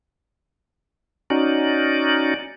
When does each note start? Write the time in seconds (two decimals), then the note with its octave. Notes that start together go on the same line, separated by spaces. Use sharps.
1.30 C#4 D#4 F#4 D5